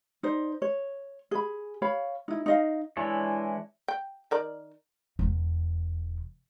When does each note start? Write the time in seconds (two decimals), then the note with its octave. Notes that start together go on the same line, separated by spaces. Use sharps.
0.23 D#4 C5 D5
0.62 C#5
1.31 G#4 B5
1.82 C#5 F5 B5
2.28 D#4 E4
2.46 D#4 D#5 F5
2.97 E3 G#3 D4 E4 C#5
3.88 G5
4.31 D#3 A#4 D5
5.19 E1 E2